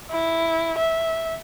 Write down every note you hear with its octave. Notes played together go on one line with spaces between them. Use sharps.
E4
E5